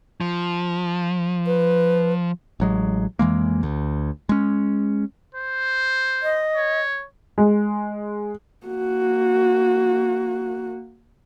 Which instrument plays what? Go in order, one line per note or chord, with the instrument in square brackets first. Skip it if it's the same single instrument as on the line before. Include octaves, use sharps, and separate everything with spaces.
[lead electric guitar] F3
[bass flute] B4
[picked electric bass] A1 F#3 G#3
F2 E3 G#3 A#3
D2
G#3 C#4
[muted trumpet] C5
[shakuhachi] D#5
[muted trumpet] C#5
[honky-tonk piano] G#3
[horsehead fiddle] A#3 F#4